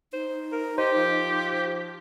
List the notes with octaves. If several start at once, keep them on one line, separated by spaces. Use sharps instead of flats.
D#4 C5
A#4
G4 C5 D#5
F3